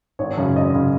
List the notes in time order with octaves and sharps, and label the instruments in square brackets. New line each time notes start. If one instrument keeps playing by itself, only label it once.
[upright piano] G#1 C#5
F#2 C#3
G#1 D#5
C#3